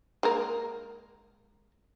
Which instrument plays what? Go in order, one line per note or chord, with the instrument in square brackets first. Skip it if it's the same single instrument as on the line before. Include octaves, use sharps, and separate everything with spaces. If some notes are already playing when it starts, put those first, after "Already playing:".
[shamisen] G#3 A#3 A#4